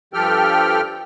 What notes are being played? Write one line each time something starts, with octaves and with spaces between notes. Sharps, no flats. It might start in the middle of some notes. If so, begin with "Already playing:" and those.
G2 F3 G4 A4 G5 F6